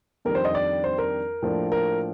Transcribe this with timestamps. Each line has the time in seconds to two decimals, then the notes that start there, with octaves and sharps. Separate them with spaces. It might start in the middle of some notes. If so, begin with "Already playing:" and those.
0.25 F2 D#3 G3 D4 A#4
0.35 C5
0.45 D#5
0.55 D5
0.84 C5
0.98 A#4
1.42 A2 F3 A#3 D4
1.72 A#4